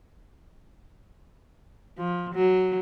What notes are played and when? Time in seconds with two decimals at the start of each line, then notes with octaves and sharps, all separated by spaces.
1.97 F3
2.35 F#3